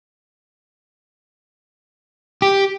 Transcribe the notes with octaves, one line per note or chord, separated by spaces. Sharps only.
G4